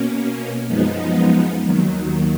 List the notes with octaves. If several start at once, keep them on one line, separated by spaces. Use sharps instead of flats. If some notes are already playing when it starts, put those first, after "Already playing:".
Already playing: B2 A#3 C#4
F#2 F3 G#3 B3 D#4
D#2 D#3 F#3